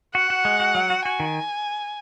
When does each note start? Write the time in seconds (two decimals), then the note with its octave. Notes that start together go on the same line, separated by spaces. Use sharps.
0.15 F#4 F#5
0.30 F#4
0.45 G#3
0.60 F#4
0.75 F#3
0.90 F#4
1.05 F#4 G#5
1.20 D#3